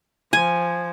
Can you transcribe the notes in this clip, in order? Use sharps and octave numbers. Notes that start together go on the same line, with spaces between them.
F3 G#5